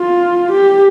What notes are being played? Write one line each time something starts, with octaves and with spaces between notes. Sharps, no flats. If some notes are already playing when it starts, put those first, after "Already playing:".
Already playing: F4
G4